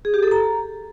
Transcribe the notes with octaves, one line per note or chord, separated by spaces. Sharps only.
G#4
G4
A4
A#5